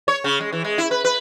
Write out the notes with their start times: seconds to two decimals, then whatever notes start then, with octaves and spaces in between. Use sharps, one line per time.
0.08 C#5
0.24 C#3
0.41 G#3
0.52 E3
0.64 G#3
0.78 E4
0.91 B4
1.04 B4